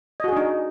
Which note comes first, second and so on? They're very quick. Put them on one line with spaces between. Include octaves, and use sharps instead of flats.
D#5 F#4 G#4 D4 D#4